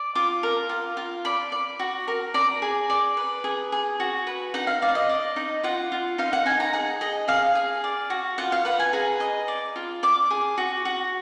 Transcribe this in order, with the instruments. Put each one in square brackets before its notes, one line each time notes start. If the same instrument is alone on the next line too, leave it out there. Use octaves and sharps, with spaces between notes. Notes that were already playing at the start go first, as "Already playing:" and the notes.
Already playing: [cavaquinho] D5
F4 D6
A#4
F4
F4
D5 B5
D5
F#4
A#4
D5 A#5
G#4
D5
B4
G#4
G#4
F#4
B4
D#4 F#5
F5
D5 F5
D#5
D5
D#4
F4 F#5
F4
D#4 F5
F#5
D#4 G#5
A#5
G#4 F#5
G#4 D#5
G#4 F5
G#4
D5
F#4
F4 F#5
F5
B4 F#5
G#5
G#4 A#5
D#5
D5
F4
D5 D6
G#4
F#4
F#4